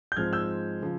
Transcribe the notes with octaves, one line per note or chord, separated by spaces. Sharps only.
G6
G#2 F3 G#3 C4 F6 G#6
E6 G6
C#3 F3